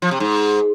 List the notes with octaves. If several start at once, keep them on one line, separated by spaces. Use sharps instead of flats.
F3
C3
G#2